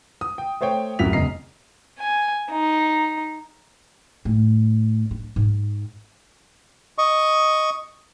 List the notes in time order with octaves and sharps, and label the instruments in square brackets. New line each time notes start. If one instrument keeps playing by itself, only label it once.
[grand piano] D#6
G5
A3 C5 C#5 G5
D1 F#2 F#3 E4 B6 F7
E1 C#3 D#5 A#5 C7
[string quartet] G#5
D#4
[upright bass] A2
D4
G#2
[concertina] D#5 C#6